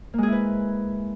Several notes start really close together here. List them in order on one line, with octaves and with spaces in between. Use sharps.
A#3 G#3 G#4 E4 B4